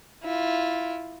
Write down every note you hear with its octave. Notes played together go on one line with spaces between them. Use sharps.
E4 F4